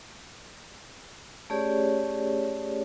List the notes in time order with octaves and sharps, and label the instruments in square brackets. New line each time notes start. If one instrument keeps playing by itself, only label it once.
[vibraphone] A3 C#4 G4 G#4 C#5 D5